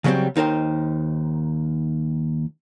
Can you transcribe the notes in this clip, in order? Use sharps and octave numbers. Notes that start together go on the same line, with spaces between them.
C#3 F#3 G3 A3 C4
D#2 D#4 A#4 C5 G5